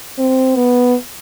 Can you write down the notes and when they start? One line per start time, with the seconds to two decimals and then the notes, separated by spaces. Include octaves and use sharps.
0.18 C4
0.56 B3